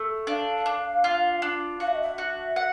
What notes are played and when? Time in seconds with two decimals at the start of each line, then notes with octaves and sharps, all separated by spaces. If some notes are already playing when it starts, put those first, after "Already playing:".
Already playing: A3
0.27 D4 F5
0.66 D4
1.04 F4
1.42 D4
1.80 F#4 F5
1.87 E5
1.95 D#5
2.02 E5
2.18 F#4
2.56 F#5